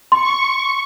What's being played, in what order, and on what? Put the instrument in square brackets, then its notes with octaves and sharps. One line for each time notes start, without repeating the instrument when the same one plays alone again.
[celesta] C6 [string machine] C#6